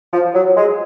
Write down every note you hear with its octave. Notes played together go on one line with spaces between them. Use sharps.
F3
F#3
G#3